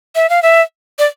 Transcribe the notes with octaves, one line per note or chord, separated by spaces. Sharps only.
E5
F5
E5
D5